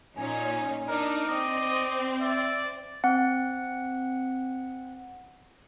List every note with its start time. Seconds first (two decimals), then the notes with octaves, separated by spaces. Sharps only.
0.17 A#2 C#4 D#4 G#5
0.88 D4 D#4 A#4
1.28 C4 D5 D#5
2.21 D5 E5
3.04 C4 F#5